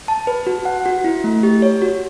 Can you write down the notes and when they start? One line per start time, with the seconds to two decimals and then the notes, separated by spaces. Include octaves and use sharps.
0.08 A5
0.27 B4
0.47 F#4
0.65 F#5
0.86 F#4
1.04 E4
1.24 A3
1.43 G4
1.62 C#5
1.82 F#4